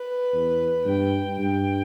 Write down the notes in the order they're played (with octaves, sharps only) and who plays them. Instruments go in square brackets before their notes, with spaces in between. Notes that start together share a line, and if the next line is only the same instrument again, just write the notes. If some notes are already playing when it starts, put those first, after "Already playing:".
Already playing: [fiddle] B4
[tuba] E2
[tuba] G2 [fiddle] G5
[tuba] G2 [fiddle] G5